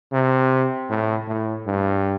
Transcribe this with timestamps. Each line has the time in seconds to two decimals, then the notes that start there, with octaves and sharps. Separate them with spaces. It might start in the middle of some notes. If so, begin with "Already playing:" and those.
0.13 C3
0.90 A2
1.28 A2
1.66 G2